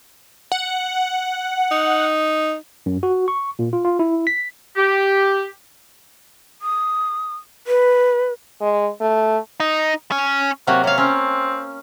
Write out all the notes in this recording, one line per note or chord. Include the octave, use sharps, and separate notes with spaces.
F#5
D#4
F#2
F#4
C#6
A#2
F4
F4
E4
B6
G4
D#6
B4
G#3
A3
D#4
C#4
C3 F#3 A#3 F#4
C3 C#5 F5
C4 C#4